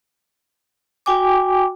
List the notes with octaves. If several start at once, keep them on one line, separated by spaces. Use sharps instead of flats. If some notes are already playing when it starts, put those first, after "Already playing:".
F#4 G5 G#5 D6